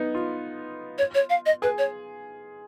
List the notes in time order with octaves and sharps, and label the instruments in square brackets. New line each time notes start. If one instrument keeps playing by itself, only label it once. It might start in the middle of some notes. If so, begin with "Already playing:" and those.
Already playing: [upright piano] B3 D#4
F4
[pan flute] C#5
C#5
F5
D#5
[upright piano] G#4 [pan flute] B4
[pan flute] C#5